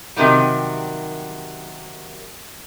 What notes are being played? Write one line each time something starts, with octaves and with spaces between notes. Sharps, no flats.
C3 D#3 F#3 G3